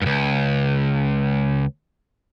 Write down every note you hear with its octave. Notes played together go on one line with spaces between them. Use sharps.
C#2 G2